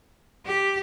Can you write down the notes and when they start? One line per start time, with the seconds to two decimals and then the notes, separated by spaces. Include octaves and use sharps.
0.46 G4